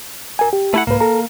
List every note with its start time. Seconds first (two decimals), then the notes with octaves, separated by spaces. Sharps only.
0.39 A#4 G#5
0.53 G4
0.74 A3 E4 F#5
0.87 C2 G#2 A#3 B4
1.00 A4 A#5